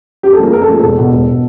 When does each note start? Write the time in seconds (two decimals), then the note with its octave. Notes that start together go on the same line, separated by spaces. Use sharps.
0.23 F#2 G4
0.33 A4
0.38 C#3 F3 A#3 G#4
0.53 F#2 A#4
0.62 A4
0.68 C#3 F3 A#3 G#4
0.80 E1 A4
0.97 E2 B2
1.13 E1
1.30 B2